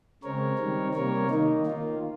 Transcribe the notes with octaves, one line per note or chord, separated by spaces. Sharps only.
C#3 G#3 C4 A#4 C#5
D#3 G3 C4
C3 G3 A#3 A#4 C#5
D#3 A#3 D#4
D#3 A#3 F4